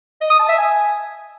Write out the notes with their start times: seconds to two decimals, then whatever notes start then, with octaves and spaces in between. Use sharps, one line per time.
0.21 D#5
0.30 D#6
0.40 A5
0.49 E5
0.58 G#5